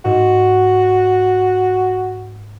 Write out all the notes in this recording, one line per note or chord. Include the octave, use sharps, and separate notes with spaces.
G#2 F#4 E7